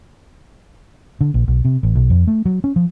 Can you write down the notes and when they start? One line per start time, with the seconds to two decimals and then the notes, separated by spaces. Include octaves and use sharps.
1.21 D3
1.34 A#1
1.48 B1
1.65 C3
1.83 A1
1.95 B1
2.10 F2
2.27 A3
2.45 F#3
2.64 C#4
2.76 F3